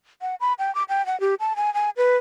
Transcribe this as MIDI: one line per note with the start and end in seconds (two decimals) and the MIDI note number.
0.22 0.35 78
0.40 0.53 83
0.59 0.73 79
0.75 0.84 86
0.89 1.05 79
1.06 1.19 78
1.20 1.35 67
1.40 1.56 81
1.56 1.73 80
1.74 1.90 80
1.97 2.17 71